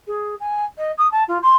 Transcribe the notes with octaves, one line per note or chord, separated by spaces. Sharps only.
G#4
G#5
D#5
D#6
A5
F4
C6